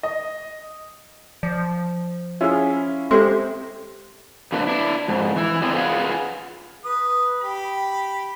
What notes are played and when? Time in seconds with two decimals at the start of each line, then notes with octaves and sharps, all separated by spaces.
0.03 D#5
1.43 F3 D5
2.41 C#4 E4 F4 G#4 E5
3.11 G#3 C4 G4 A4 C5 E5 C6
4.52 F2 D3 A3 A#3 D4 B4
4.67 D4 E4
5.08 F2 G#2
5.36 E3 E4
5.62 B3 C4 D4 E4 G#4 D#5
5.75 F4 G#4 B4 F5 F#5
6.84 B4 D#6
7.41 G4 B5